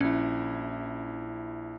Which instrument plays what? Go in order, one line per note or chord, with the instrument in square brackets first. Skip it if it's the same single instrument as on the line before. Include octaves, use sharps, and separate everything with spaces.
[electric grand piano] A#1 E4 [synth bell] C#4